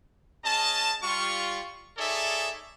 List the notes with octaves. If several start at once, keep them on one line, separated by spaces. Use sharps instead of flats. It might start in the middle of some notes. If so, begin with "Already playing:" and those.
C#4 G#4 D#5 A5
G3 F4 C#6
D#4 G#4 A4 C#5 D5 E5